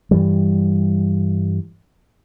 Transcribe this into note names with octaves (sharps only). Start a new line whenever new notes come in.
G2 E3 G3